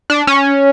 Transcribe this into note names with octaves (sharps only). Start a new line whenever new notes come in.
D4
C#4